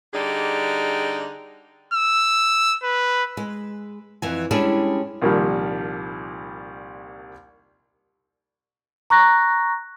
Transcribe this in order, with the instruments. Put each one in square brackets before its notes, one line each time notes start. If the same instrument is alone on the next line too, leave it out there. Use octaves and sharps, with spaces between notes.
[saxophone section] D3 G3 D#4 G#4
[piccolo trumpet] E6
B4
[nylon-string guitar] G#3
F2 E3 G#5
G3 G#3 C#4 D4 E4 G#4
[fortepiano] C2 A#2 D#3 F3 G3
[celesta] A#5 C#6 F#6 A#6